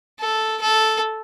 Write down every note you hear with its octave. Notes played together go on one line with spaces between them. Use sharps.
A4
A4